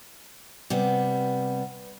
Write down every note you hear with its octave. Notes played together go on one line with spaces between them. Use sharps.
C3 G3 B3